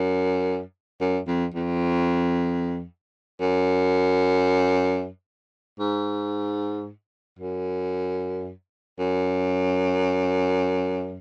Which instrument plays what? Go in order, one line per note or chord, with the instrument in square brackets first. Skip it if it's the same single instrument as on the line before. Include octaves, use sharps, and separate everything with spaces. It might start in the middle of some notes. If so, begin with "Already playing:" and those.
Already playing: [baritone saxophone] F#2
F#2
F2
F2
F#2
G#2
F#2
F#2